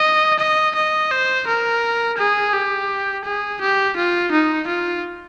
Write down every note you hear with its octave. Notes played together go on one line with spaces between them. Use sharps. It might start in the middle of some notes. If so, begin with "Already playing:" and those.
Already playing: D#5
D#5
D#5
C5
A#4
G#4
G4
G#4
G4
F4
D#4
F4